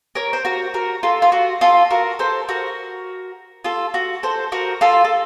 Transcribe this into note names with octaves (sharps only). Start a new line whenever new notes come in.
A#4 C#5
C5
F#4 A#4
F#4 A#4
F4 A4
F4
F#4
F4 A4
F#4 A#4
A4 C5
F#4 A#4
F4 A4
F#4
A4 C5
F#4 A#4
F4 A4
A4